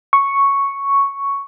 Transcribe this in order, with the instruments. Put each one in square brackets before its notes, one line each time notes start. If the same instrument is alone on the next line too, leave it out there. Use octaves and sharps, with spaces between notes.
[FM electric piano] C#6